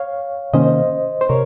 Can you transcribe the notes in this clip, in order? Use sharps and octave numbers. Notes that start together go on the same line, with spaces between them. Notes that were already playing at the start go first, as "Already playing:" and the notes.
Already playing: C#5 F5
C3 D#3 A#3 C#4 C5 D#5
C5
C3 A#4 C#5